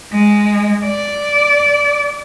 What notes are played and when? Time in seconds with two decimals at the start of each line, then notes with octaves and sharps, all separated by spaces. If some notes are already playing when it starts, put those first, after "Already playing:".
0.12 G#3
0.85 D5